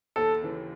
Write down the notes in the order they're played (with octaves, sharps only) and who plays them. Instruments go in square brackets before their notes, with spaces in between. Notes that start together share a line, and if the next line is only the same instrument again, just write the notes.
[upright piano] D#2 [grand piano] A4
[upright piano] C#3 E3